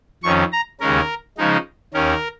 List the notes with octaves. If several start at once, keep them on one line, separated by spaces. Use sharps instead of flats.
F2 D#3 C#4 C#6
A#5
D#2 C#3 G#3 C#4 A#4
C#3 F3 G#3 D#4
D#2 D#3 C#4 A#4